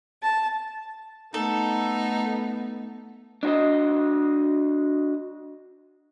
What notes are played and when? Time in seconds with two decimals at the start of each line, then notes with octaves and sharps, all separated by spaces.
0.22 A5
1.34 A3 B3 D#4 A4
3.43 D4 F#4 C5 D#5